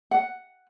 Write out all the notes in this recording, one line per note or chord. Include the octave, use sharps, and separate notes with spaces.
F#5